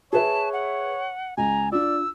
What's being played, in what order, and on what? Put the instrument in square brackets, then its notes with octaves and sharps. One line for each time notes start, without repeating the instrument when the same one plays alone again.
[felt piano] G#4 B4 E5 [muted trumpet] C#5 [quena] A5
[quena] F#5
[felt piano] C#2 [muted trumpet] G#5 [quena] A#5
[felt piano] D4 F4 [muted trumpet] D5 [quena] E6